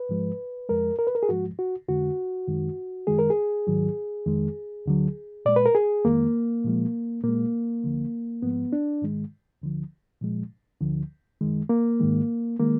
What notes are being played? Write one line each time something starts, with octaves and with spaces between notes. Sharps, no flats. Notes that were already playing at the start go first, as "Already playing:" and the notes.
Already playing: B4
G#2 F3 G#3
F2 F3 G#3 A#4
A#4
B4
A#4
G#4
G#2 F3 G#3 F#4
F#4
F2 D3 G#3 F#4
F#2 D#3 G#3
F#2 D#3 G#3 G#4
A#4
G#4
G#2 D#3 F#3
F2 D#3 G#3
D2 D3 F#3
A#2 G#3 D5
B4
A#4
G#4
F2 D#3 G#3 A#3
A#2 F3 G#3
A#2 G#3 A#3
D2 D3 F3
G#2 F3 G#3 B3
D4
G#2 D#3 G#3
D2 D3 F3
A#2 F3 G#3
D2 D3 F3
F#2 D#3 G#3
A#3
G#2 D#3 G#3
D#3 G#3 A#3